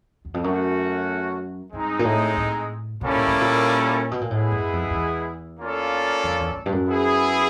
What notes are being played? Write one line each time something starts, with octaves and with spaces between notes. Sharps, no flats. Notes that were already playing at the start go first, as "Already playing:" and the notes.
E2
F2
F#2 A3 C#4 F#4
G2 G#3 C4 D#4
A#2
A2
A2
B2 G3 A#3 C#4 E4 A4
A#2
A2
A#2
B2
A#2
A2 G#3 B3 E4 G#4
F#2
F2
F2
E2
A#3 C#4 F4 A4 D5
F2
E2
F2
G2
F#2
B3 E4 G#4